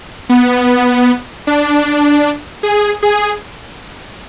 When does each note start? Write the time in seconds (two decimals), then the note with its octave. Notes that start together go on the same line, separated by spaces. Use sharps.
0.29 B3
1.47 D4
2.63 G#4
3.03 G#4